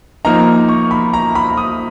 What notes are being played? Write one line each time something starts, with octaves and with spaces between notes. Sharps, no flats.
F3 A#3 D#4 A#5
C#6
B5
A#5
B5
D#6